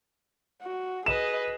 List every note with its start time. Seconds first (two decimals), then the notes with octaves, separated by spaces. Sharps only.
0.62 F#4
1.06 G#4 B4 D#5 E7